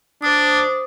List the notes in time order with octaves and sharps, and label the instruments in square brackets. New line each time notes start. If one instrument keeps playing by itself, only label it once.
[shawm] D4 [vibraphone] C5 D6 D#6